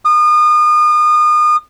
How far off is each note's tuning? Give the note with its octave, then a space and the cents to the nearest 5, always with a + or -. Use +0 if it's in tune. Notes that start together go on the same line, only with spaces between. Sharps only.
D#6 -35